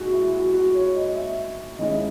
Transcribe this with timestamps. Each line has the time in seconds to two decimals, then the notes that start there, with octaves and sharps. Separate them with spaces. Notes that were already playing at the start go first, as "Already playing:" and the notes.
Already playing: A#2 G#3 D#4 F#4 G#4
0.13 E4
0.33 F#4
0.54 F#4
0.74 C#5
0.95 D#5
1.16 E5
1.79 D#2 D#3 G#3 C#4 E4 D#5